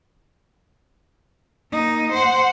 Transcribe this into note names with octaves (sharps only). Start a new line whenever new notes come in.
A#3 D#4
C5 F#5